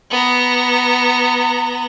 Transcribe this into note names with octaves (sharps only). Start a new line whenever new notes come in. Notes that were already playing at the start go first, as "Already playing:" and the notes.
B3 A#5